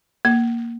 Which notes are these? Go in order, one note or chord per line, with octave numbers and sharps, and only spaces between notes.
A#3